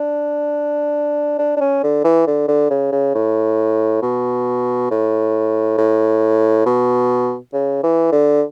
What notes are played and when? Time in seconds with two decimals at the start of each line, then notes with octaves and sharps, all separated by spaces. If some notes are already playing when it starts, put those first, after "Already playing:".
Already playing: D4
1.39 D4
1.56 D4
1.60 C#4
1.83 D3
2.04 E3
2.27 D3
2.48 D3
2.70 C#3
2.92 C#3
3.15 A2
4.02 B2
4.91 A2
5.78 A2
6.66 B2
7.53 C#3
7.83 E3
8.12 D3